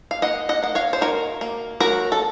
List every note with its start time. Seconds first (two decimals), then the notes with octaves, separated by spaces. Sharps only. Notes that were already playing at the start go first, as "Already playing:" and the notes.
0.11 F5
0.22 A#3 D#5 F#5
0.49 D#5 F#5
0.62 A#3 F#5
0.75 C#5 F5
0.93 C5
1.01 D#3 F#4 A#4
1.41 A#3
1.80 F#3 F#4 A#4
2.12 A4